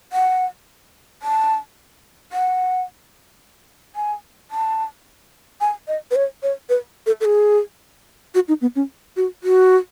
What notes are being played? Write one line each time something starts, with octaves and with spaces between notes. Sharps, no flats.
F#5
A5
F#5
G#5
A5
G#5
D#5
B4
C#5
C#5
B4
A4
A4
G#4
F#4
D#4
B3
C#4
F#4
F#4